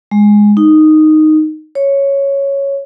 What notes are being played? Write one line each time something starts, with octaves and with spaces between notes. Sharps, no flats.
G#3
D#4
C#5